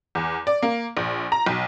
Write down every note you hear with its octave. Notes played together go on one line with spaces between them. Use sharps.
E2
D5
A#3
A#1
A#5
B1